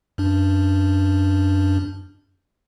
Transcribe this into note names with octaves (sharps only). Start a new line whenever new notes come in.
F#2 D4